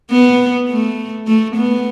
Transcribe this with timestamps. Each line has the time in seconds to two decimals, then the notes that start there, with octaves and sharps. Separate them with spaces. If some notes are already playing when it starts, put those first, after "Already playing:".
0.11 B3
0.69 A3
1.27 A3
1.56 B3